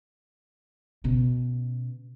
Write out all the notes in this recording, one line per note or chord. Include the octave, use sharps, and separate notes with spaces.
B2 C#4